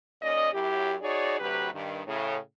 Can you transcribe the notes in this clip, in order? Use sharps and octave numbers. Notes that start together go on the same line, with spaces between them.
D#2 C#4 D5 D#5
F#2 F#3 E4 G4
D#4 F#4 G#4 C#5 D5
D2 C3 F#3 G4 B4
G2 D#3
A2 C#3